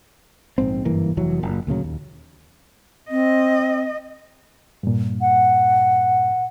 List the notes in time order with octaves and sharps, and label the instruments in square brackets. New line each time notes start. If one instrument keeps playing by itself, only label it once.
[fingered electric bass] A#1 G#2 C4
F#1 G2 E3 A#3
F1 F2 E3 F#3
F#1 A#2
D2 A#2 C#3 F#3
D#2
[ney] C4 [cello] D#5
[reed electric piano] G2 A#2
[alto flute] F#5